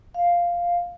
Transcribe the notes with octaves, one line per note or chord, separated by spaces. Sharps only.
F5